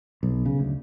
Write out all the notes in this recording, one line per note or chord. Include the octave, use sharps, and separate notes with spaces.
B1
C#3
D2